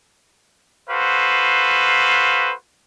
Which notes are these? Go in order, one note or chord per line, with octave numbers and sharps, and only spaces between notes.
F#4 A4 B4 C5 F5